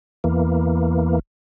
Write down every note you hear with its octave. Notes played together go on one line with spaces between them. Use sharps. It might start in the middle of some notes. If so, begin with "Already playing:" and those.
E2 E3 A#3